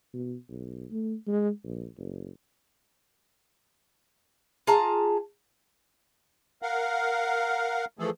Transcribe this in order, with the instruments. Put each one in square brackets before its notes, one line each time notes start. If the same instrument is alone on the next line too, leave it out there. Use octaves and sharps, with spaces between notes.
[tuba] B2
B1
A3
G#3
A#1
F#1
[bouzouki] F4 G#4 A5 A#5
[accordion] A#4 F5 F#5
E3 F3 A3 G#4 A4